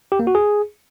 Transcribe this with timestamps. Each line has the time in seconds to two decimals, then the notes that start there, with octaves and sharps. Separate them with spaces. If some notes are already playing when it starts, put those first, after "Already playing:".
0.12 G4
0.19 A#3
0.27 F#4
0.35 G#4